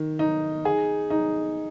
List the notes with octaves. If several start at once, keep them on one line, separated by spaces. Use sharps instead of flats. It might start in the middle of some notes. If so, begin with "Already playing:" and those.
Already playing: D#3
D#4
G#4
D#4